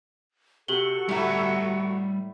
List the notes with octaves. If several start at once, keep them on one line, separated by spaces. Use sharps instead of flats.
C3 F#4 G4 A4 C#6 F#7 G7
A2 G3 E4 A#5